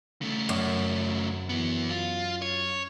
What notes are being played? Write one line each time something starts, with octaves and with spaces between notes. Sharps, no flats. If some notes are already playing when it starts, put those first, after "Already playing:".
C#3 A3
F#2
E3 B3
F4
C#5